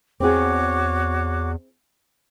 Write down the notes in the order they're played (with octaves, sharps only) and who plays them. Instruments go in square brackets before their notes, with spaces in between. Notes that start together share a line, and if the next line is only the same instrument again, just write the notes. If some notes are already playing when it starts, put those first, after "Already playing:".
[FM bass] E2 [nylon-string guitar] C4 E4 G#4 [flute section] F#4 C#5 D6